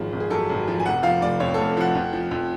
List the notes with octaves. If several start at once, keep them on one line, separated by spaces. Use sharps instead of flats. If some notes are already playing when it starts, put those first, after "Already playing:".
Already playing: G#1 F3 G#4
G#1
G#4
F#2 A4
G#1
F3
G#5
F1 F#5
F3 F5
F1 D5
F2 C#5
F1 A4
F3 F#5
F2
F3
F2